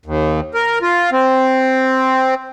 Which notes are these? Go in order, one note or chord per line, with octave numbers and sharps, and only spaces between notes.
D#2
A#4
F4
C4